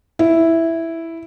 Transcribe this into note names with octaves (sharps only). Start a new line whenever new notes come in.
E4